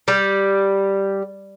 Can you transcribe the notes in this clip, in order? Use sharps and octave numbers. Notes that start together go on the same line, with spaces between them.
G3